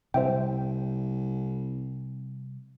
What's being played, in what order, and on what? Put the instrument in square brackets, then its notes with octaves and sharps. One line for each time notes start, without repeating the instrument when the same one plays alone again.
[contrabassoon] C2 [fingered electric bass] C3 G3 [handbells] C5 E5 G5